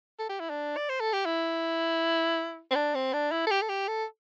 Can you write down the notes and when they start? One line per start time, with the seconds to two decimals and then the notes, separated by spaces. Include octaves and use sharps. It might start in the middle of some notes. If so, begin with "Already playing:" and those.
0.19 A4
0.29 G4
0.40 E4
0.50 D4
0.77 D5
0.89 C5
1.01 A4
1.13 G4
1.25 E4
2.71 C4
2.75 D4
2.95 C4
3.13 D4
3.32 E4
3.47 A4
3.51 G4
3.62 A4
3.69 G4
3.88 A4